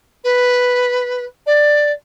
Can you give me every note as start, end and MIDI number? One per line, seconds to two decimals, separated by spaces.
0.24 1.25 71
1.46 1.92 74